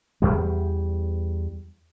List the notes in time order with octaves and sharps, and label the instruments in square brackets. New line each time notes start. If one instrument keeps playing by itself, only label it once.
[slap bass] E2 G3